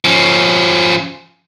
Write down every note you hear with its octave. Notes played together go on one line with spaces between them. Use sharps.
F3 C#4